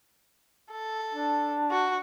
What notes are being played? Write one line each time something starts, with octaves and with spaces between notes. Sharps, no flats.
A4
D4
F#4